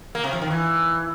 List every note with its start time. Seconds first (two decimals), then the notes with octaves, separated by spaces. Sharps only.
0.15 A#3
0.24 C3
0.33 F3
0.42 D#3
0.50 E3